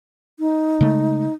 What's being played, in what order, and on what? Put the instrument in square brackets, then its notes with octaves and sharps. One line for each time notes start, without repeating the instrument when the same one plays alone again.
[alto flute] D#4
[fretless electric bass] C#3 G#3 A3